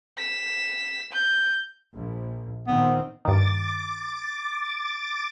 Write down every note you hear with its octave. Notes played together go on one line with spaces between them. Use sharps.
B6 E7
G6
A#1
A#2 D#3 B3 C4
G2 D#3 D6 A6